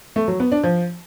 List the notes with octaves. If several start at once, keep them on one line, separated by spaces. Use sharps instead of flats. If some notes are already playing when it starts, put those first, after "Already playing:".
A3
F#3
B3
D4
F3